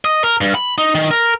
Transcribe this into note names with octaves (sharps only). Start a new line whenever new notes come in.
D#5
A#4
G2
B5
D#4
D#3
A#4